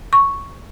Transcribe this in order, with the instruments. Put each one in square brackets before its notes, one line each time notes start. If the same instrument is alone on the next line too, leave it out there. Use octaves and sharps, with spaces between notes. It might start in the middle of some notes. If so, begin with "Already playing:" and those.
[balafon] C#6